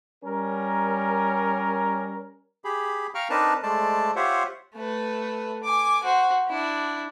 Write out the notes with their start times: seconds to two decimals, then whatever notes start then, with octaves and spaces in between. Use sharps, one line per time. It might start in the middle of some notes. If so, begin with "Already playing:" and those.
0.24 G3 C#4 A#4
2.64 G4 G#4 B5
3.15 F5 G5 A#5 C#6 F6
3.30 C4 D4 D#4 A#4 B4 A5
3.63 G#3 A3 C5 D5 A5
4.16 F4 G4 C5 C#5 E5 F#5
4.75 A3 B4
5.64 G#5 D6
6.03 F#4 C5
6.48 D4 E4